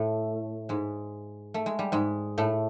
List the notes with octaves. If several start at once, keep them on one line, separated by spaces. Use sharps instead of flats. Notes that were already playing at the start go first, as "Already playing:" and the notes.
Already playing: A2 A3
G#2 G#3
A3
G#3
G3
G#2 G#3
A2 A3